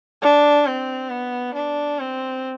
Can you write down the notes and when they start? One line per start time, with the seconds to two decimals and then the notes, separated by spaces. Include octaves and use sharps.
0.22 D4
0.66 C4
1.10 B3
1.55 D4
1.99 C4